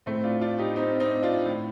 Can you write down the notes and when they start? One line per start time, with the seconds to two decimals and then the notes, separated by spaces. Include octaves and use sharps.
0.06 A2 A3 C4
0.24 D4 F4
0.41 D4 F4
0.58 D#4 G4
0.76 C4 D#4
1.00 C4 D#4
1.22 D4 F4
1.46 A2